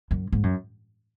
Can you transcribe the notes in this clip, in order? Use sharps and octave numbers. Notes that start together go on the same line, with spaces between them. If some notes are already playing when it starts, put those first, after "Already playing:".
F#2
G#2
F#2